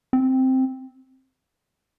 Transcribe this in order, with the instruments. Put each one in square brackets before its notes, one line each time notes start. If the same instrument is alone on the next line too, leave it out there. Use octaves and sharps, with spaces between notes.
[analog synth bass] C4